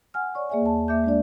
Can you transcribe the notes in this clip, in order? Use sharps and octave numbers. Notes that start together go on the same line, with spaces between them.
F#5 G#5 F6
C#5 D5 C#6
A#3 G#4 D5 E5 G#5
D#2 A5
A#3 E5 D6 G6
G#3 D4 D5